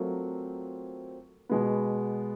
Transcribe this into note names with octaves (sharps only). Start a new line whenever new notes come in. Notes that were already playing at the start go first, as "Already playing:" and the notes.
Already playing: F#3 A3 C4 F4 A#4
B2 G#3 B3